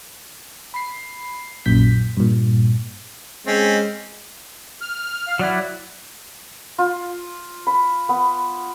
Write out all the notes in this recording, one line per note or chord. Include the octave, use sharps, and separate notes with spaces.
B5 C7
A#1 F#2 A#2 G6 B6
G2 A#2
G#3 C4 C#4
F6
F5
F#3 E4 D5 F#5
F4
B5
B3